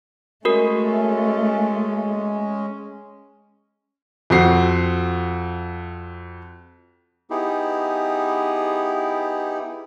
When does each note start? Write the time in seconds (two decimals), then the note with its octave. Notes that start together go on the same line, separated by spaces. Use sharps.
0.45 G#3 A3 C#4 F#4 A#4
4.30 F2 C4 F#4 C7
7.30 B3 D#4 E4 G4 G#4